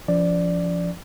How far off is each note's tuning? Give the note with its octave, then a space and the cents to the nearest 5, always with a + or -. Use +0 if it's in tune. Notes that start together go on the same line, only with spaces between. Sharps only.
F3 -15 C#4 +40 D5 +0